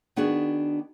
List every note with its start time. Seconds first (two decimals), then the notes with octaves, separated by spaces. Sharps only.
0.16 D#3 B3 D4 F#4 G#4